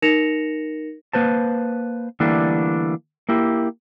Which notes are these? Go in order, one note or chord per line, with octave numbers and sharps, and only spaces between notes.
D#4 A#4 A#6 C#7 E7 F7
A#3 B4 C5 A5
D3 E3 G3 A3 A#3 D4
A#3 E4 G4